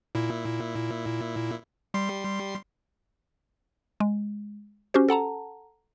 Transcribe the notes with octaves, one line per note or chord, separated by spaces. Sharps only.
A#2 E4
G3 C6 C7
G#3
C#4 F#4 G4 C5
A4 F#5 A5 A#5